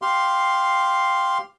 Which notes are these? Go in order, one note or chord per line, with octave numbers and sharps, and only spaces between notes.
G4 F5 C6